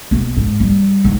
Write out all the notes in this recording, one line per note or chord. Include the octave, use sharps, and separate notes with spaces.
B1
G#2
G3
G#2